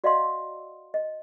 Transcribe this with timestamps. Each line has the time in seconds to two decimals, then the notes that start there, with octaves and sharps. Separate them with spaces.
0.04 F#4 D5 D#5 F5 F#5 C6
0.94 D#5